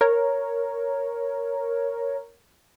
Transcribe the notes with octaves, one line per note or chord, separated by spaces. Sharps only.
A#4 C#5